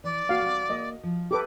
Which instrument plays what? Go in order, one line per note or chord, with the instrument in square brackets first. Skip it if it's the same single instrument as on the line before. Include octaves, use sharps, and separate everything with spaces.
[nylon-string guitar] E3 [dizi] D5
[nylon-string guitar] A#3 [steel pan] F#4 F5
[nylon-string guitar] G3 C4
[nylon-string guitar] A#3 [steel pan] D#5
[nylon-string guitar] F3
[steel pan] G4 A4 B4 [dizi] D6